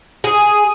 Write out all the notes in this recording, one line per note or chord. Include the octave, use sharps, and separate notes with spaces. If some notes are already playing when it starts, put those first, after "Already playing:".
G#4